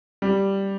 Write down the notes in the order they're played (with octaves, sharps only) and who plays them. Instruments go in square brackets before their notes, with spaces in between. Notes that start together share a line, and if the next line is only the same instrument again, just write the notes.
[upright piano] G3